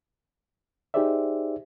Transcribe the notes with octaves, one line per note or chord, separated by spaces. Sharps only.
D#4 G4 G#4 C5 D5 E5